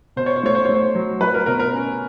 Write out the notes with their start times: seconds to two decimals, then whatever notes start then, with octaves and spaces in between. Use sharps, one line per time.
0.16 B2 C5
0.26 C#5
0.36 C5
0.43 A3 C#5
0.55 C5
0.65 A3 C#5
0.74 C5
0.95 F#3
1.20 F#3 B4
1.34 A#4
1.46 B2 A#4
1.60 A#4
1.73 C#4